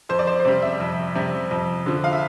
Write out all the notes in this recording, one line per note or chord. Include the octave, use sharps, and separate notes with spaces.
F2 C5
D5
C5
C5
C3 G3 D5
E5
F2
C3 G3
F2
D3 F3
F5
E5